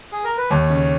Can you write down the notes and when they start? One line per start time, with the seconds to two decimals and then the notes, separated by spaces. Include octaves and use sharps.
0.12 G#4
0.24 A#4
0.37 B4
0.50 D#2 C#5
0.70 C#3